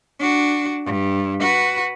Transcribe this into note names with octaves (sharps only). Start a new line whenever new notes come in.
D4 F#4
G2
F#4 B4